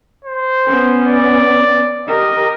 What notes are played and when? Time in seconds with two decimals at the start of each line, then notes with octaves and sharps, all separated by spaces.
0.25 C5
0.65 B3 C#4
1.07 D5
2.08 G4 A#4 D#5